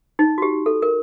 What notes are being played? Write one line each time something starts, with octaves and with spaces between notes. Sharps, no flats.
D#4
F#4
G4
A4
A#4